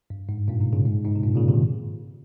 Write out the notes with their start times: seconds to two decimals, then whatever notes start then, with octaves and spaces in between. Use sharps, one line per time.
0.10 G2
0.29 G#2
0.48 G2 A#2
0.61 G#2 C3
0.73 A#2 C#3
0.85 G#2
1.04 G#2
1.15 C3
1.24 G2 A#2
1.36 A#2 C#3
1.48 C3 D#3